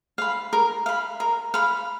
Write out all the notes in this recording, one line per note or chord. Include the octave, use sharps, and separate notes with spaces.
F5 B5
A#4
F5 B5
A#4
F5 B5